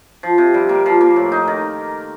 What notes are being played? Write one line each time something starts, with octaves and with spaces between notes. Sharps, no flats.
F3
C3
G3
A#3
F3
A#3
A2
D#4
D#3